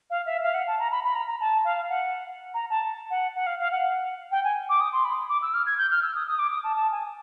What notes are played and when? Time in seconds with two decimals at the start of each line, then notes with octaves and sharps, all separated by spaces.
0.10 F5
0.26 E5
0.42 F5
0.54 F#5
0.67 A5
0.79 A#5
0.92 B5
1.04 B5
1.15 A#5
1.27 A#5
1.40 A5
1.65 F5
1.89 F#5
2.54 A#5
2.70 A5
3.10 F#5
3.35 F#5
3.46 F5
3.60 F5
3.72 F#5
4.32 G5
4.44 G#5
4.69 D6
4.81 D#6
4.93 C6
5.05 B5
5.29 D6
5.42 E6
5.54 F6
5.66 G#6
5.78 G6
5.91 F6
6.03 E6
6.15 D#6
6.27 D#6
6.39 D6
6.52 D#6
6.64 A5
6.76 A5
6.92 G#5